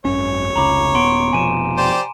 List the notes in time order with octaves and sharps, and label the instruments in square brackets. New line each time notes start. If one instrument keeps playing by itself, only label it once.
[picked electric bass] G#1 F#2 C#4 [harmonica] C#5
[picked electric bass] F1 C#2 C#3 [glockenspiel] A#5 B5 D6
[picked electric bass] D#1 B3 [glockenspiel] C6 D7
[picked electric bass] F1 B2 F3 [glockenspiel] G#5 D#7 E7
[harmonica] G4 C5 D5